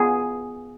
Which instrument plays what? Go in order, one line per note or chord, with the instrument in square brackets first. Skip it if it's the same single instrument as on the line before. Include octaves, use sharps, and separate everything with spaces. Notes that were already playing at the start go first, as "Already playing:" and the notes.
Already playing: [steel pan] B3 F4 G#4